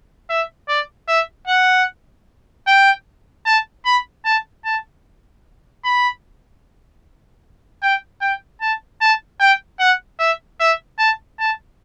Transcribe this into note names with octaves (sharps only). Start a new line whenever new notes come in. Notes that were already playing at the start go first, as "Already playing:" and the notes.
E5
D5
E5
F#5
G5
A5
B5
A5
A5
B5
G5
G5
A5
A5
G5
F#5
E5
E5
A5
A5